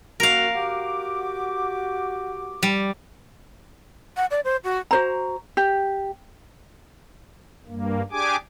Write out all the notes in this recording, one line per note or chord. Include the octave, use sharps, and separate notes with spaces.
F#2 A#3 F#4 A#4 F5
F#4 G4 D6
G3
F#5
D5
C5
F#4
F#4 C5 A#5
G4
G2 A#3
D4 G4 G#4 G#5 D6